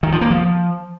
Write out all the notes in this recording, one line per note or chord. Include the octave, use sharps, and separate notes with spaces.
D#3
F3
A#3
F3